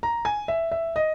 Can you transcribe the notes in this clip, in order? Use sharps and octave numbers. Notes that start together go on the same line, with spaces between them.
A#5
G#5
E5
E5
D#5